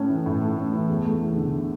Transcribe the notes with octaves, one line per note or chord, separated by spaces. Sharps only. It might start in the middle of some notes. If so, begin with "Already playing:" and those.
Already playing: A2 A3 C#4
E3
A2
A3
C#4
E3
E2
A3
E2
D3